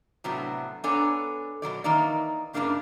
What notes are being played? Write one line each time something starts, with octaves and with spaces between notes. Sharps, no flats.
A2 C3 F#3 B3 D4 F#4
B3 D4 A4 C#5 G#5 A#5
B2 E3 F#3 D5
D#3 E3 A#3 D#4 D5
G2 C#3 F3 A#3 D4 E4